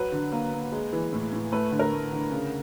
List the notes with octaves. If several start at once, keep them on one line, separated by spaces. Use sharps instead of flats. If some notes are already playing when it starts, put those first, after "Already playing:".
Already playing: F#3 B4
D3
A#3
A#3
G#3
E3
A2
A2
A3 B4
D3
A#4
A3
D3
C#3